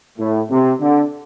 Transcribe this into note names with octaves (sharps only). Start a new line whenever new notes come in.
A2
C3
D3